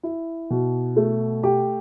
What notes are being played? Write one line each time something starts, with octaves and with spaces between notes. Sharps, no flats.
E4
B2
A3
G4